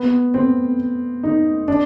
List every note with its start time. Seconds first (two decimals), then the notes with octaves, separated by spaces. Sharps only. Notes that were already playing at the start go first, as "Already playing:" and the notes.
Already playing: B3
0.34 C4
1.23 D#4
1.68 D4